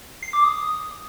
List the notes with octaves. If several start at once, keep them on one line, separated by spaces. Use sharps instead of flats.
C7
D6
D#6